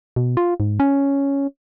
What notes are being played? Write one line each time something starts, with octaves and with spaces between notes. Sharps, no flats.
B2
F4
G#2
C#4